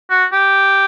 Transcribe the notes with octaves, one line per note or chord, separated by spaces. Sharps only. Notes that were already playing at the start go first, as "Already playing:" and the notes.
F#4
G4